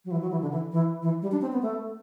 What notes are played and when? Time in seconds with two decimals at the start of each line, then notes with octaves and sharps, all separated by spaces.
0.05 F#3
0.11 E3
0.22 F#3
0.31 E3
0.42 D3
0.52 E3
0.72 E3
1.02 E3
1.22 G3
1.32 D4
1.42 C4
1.52 B3
1.62 A3